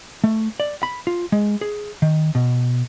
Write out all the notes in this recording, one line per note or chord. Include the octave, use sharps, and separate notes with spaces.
A3
D5
B5
F4
G#3
G#4
D#3
B2